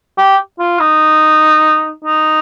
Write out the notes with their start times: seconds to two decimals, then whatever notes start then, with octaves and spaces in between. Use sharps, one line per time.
0.18 G4
0.59 F4
0.80 D#4
2.04 D#4